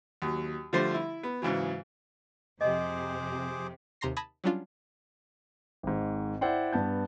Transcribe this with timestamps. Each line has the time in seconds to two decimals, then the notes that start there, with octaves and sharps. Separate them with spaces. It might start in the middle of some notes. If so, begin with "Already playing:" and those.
0.22 D#2 F#3
0.73 D3 F3 G3 A3 C5
0.94 E4
1.23 B3
1.42 G#2 C#3 E3 F#3
2.61 F2 C3 G#4 C5 D#5 D6
4.01 D#2 C3 A#5 C6 A#6 C7
4.16 A5 B5 D#6 G#6 A#6
4.44 F#3 G3 C#4 D4 F4
5.83 G#1 G#2
6.41 E4 C5 D5 F#5 G5 C6
6.73 G2 B3 A5 G6